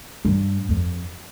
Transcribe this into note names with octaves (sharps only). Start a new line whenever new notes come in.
G2
F2